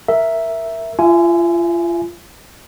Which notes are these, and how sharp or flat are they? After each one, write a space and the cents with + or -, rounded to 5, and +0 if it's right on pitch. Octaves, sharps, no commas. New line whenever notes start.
A#4 +0 E5 +0
F4 -30 E5 +15 G#5 +10